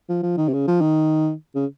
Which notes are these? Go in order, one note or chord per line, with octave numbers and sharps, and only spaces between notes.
F3
F3
D#3
C3
C#3
F3
D#3
C#3